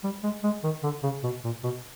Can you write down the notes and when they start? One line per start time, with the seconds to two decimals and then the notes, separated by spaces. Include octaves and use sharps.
0.04 G3
0.23 G#3
0.44 G#3
0.64 D#3
0.83 D3
1.03 C#3
1.23 B2
1.44 A#2
1.63 B2